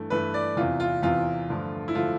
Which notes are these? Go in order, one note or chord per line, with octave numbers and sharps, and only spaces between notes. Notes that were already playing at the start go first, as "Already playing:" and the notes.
Already playing: G2 E3 A3
G2 E3 A3 B4
D5
E2 C3 E3 F4
F4
E2 C3 E3 F4
G2 D3 F3 A3
E4
D3 F3 A3 F4